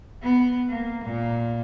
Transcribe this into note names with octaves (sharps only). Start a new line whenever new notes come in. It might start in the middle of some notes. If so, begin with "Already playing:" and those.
B3
A#3
A#2